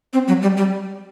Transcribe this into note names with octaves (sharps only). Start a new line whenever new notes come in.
C4
F#3
G3
G3